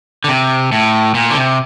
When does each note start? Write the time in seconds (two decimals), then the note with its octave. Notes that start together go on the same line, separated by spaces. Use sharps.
0.24 D3
0.28 C3
0.72 A2
1.14 A#2
1.31 D3
1.37 C3